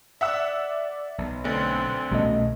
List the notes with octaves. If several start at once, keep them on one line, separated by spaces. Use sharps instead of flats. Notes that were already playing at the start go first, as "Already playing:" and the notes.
D5 E5 F#5 E6
B1
D2 D3 C4
D#1 C2 B2 A3 C#4 D#5